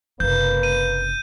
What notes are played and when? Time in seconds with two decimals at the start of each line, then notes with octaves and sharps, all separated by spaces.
0.20 F#1 C3 A#3 A#4 B4 G6
0.63 D#7